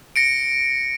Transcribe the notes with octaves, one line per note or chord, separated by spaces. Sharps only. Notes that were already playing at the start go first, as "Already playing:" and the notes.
A#6 C#7 D7